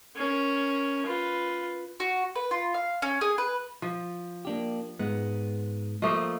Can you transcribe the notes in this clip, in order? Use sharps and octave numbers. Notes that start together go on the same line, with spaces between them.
C#4 A#4
F4 B4
F#4
B4
F4
F5
C#4
G#4
B4
F3
A#3 D4 G4
G#2 G#3 B3 F#5
F3 A3 A#3 C5 D#5